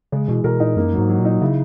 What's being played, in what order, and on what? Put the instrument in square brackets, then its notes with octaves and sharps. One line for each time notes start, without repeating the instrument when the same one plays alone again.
[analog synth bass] C#3 [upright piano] G#3
[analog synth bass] B2 [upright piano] E3
[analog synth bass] B2 [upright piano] A#4
[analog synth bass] A#2 [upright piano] D#4
[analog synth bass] F#2 [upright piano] A#3
[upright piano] F#3
[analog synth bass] G#2
[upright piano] F#3
[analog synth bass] A#2
[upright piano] D#4
[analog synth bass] C#3 [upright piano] E4